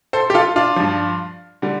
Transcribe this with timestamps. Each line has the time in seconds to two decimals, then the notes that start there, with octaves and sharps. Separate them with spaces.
0.13 A4 C5
0.30 G4
0.34 F4 A4
0.56 D4 F4
0.76 G2 F3
1.62 D3 G3